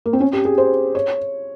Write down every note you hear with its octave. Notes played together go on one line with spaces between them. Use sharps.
A#3
C4
C#4
G4
G#4
C5
C#5